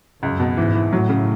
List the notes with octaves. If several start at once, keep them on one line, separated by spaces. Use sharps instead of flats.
C#2 F#2
B2
G#2 E3
E3
A2 F#3
C#3